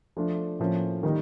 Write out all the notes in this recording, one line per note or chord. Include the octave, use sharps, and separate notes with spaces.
F3 A3 D4 F4
A2 F3 A#3 C#4
D#3 G3 A#3 D#4